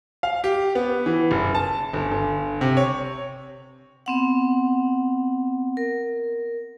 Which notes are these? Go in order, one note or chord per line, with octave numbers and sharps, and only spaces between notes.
F5
G4
B3
E3
F#1
A5
G1
G1
C3
C#5
B3 C4 F#5
A#4